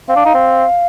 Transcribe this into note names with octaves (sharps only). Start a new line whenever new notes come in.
C4 F5
D4
D#4
C4